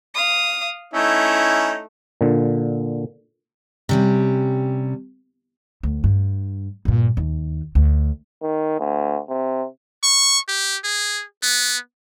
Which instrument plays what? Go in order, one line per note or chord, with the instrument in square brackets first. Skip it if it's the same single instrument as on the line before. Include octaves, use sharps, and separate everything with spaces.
[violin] F5 D#6
[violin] A3 [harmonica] C#4 D#4 E4
[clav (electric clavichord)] A#2 D3
[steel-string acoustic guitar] C3 G3 C#4
[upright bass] D2
G2
G2 A#2
D#2
D2
[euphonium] D#3
D2
C3
[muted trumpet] C#6
G4
G#4
B3